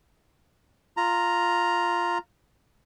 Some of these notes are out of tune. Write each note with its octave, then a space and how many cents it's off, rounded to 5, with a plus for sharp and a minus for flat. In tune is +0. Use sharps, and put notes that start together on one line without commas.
F4 +0 A#5 +0